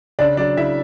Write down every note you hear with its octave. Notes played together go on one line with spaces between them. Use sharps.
C#3 D4 D5
F#3 D4 D5
C#3 E4 E5